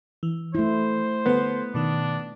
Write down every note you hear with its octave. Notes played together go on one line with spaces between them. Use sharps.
E3
A3 E4 C5
D3 B3 A4
B2 D#3 D4